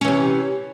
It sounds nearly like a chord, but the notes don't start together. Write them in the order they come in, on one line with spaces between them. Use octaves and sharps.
C#4 E3 C3